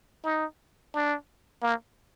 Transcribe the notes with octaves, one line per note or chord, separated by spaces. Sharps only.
D#4
D4
A#3